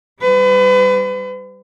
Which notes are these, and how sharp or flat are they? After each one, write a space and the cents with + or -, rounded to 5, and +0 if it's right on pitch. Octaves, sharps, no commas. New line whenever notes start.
G3 -10 B4 +35